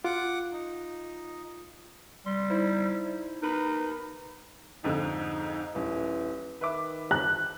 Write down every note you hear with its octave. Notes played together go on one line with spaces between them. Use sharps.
F4 F#5 D6
D#4
G3 C6
D#4 E4 C5
D#4 A#4 B4 B5
F2 G#2 D3 D#4
D#1 E3
D#3 B4 E5 D6
F#6